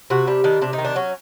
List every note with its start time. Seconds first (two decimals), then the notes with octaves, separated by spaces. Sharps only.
0.10 C3 F#4
0.27 G3 D4
0.44 D#3 D4
0.62 C3 D4
0.73 D#4
0.78 D#3
0.85 D4
0.96 F#3 C#4